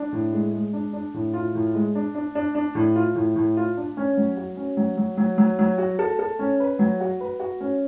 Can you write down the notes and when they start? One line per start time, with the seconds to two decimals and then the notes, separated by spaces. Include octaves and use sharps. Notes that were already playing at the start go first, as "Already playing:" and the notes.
Already playing: D4
0.13 A2
0.33 G#3
0.53 G#3
0.73 D4
0.93 D4
1.14 A2
1.34 F4
1.55 A2
1.75 G#3
1.95 D4
2.15 D4
2.35 D4
2.55 D4
2.75 A2
2.96 F4
3.15 A2
3.36 A2
3.57 F4
3.77 D4
3.97 C#4
4.17 F#3
4.37 F#4
4.57 C#4
4.77 F#3
4.97 F#3
5.17 F#3
5.38 F#3
5.59 F#3
5.78 F#4
5.99 A4
6.19 A4
6.39 C#4
6.60 B4
6.79 F#3
7.00 F#4
7.21 B4
7.40 F#4
7.61 C#4